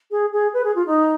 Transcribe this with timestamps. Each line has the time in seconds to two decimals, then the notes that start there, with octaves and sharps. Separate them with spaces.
0.11 G#4
0.33 G#4
0.54 B4
0.64 G#4
0.75 F4
0.86 D#4